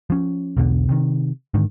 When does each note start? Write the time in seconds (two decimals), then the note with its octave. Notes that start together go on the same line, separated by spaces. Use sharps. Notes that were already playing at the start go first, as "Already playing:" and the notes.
0.10 F3 C#4
0.57 B1 E2 B2 D3
0.89 C3 D#3
1.54 G#2 D3 D#3